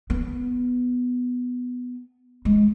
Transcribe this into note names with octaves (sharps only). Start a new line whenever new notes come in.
B3
G#3